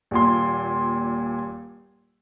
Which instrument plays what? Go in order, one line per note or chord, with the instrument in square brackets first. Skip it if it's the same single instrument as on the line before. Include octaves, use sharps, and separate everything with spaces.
[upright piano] D#1 A#2 C6